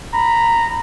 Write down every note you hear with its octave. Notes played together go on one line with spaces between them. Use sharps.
A#5 B5